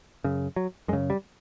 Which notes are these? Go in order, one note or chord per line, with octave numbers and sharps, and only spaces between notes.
F#2 C#3
F#3
F#2 C#3 G#3
G3